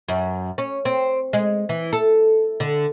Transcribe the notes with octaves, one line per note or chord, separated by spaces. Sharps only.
F#2
C#4
C4
G#3
E3
A4
D3